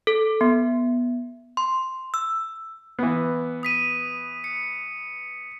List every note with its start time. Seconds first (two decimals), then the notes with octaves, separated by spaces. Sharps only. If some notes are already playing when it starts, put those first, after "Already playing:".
0.07 A4
0.41 B3
1.57 C6
2.14 E6
2.99 E3 B3
3.63 D#6 B6 D#7
4.44 C#7